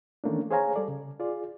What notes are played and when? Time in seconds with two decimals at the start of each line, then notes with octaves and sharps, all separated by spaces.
0.24 D#3 E3 A3 A#3 C#4 D4
0.51 G#4 C5 C#5 F5 G#5 A#5
0.76 G3 A4 D5
0.88 C#3
1.20 F4 G#4 D5